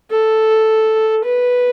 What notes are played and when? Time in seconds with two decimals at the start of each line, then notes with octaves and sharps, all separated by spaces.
0.11 A4
1.25 B4